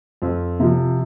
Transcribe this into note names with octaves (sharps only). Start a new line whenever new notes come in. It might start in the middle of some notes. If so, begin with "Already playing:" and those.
F2
C3 F3